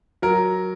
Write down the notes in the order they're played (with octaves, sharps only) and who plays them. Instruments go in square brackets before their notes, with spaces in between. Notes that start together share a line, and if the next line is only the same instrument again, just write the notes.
[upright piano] F#3 A#4